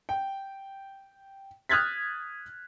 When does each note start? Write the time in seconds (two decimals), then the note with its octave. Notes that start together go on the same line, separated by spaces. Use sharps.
0.09 G5
1.69 D#6 F6 F#6 G#6 A6 B6